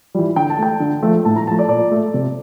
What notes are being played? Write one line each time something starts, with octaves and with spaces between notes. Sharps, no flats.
E3 G3
D3 G5
A5
A3 G5
D3
F3 A3
A2 A5
A#5
F3 A3 A5
D5
A#2 D5
A3
C3